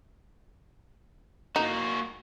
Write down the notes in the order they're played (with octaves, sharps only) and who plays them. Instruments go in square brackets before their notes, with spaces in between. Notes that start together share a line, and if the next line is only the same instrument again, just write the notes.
[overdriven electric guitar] A#3 F#4 [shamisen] D#4